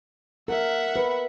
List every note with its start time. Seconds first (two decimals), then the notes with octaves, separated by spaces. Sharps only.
0.48 A#4 E5 F#5
0.96 B4